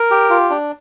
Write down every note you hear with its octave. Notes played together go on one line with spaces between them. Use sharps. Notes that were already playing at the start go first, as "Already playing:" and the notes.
Already playing: A#4
G4
F4
D4